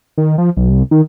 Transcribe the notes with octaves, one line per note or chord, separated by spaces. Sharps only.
D#3
F3
B1
C2
D#3